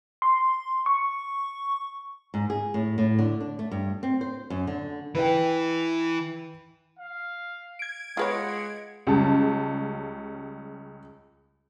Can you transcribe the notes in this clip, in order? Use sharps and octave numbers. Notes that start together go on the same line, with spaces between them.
C6
C#6
G#2
G#4
A2
A2
D3
D4
A3
G2
C4
C5
F#2
D3
E3 E4 B4 G5
F5
G#6 D7
G#3 F4 B4 C#5 F#5
C#2 C#3 G3 A5